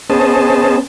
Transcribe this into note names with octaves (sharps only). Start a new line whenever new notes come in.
B3 C#4 G#4 C5 D#5 A5